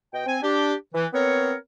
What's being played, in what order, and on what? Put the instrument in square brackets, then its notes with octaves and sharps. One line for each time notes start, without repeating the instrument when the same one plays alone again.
[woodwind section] B2 D#5 G5
C4 G#5
D4 G4
E3
B3 C4 A#4 C#5